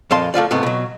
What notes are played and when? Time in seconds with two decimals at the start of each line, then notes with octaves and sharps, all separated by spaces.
0.11 F2 A#2 F5 A5 C6
0.34 A3 A#3 F4 D5
0.51 G#2 C3 A3 B3
0.63 B2 F#3